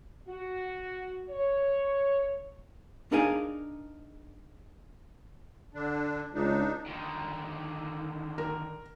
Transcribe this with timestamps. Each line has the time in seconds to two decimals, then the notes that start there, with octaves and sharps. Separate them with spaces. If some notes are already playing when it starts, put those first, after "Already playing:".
0.28 F#4
1.29 C#5
3.12 D4 D#4 G#4 A#4 F5 G#5
5.74 D3 D4
6.34 C#2 D4 D#4
6.86 D3 D#3
8.38 A#4